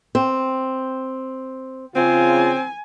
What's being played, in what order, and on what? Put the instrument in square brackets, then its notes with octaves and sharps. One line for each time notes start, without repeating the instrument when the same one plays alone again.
[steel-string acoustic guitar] C4
[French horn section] C#3 F4 [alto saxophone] C4 [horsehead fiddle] G#5